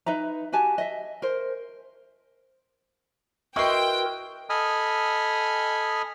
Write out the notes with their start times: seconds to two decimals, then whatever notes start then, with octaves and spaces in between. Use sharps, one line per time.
0.06 D#4 B4 E5 A#5
0.52 F#4 G4 G#5 A5
0.78 D#5 E5
1.22 A#4 C5
3.56 E4 F#4 A#4 B4 D#5 G5 C6 C#6
4.50 A4 D#5 G#5 B5 D#6 F6